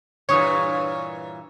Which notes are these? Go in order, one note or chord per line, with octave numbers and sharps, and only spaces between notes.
G2 A#2 E3 C#5 C#6 D#6